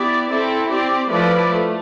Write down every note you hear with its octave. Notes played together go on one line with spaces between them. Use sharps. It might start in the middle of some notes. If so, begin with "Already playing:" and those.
Already playing: B3 E4 G4 D5
C4 E4 A4
C4 G4 D5
F3 A3 E4 B4 D5
A3